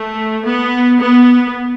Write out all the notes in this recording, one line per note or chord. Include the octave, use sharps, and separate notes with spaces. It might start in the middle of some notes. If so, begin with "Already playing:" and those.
Already playing: A3
B3
B3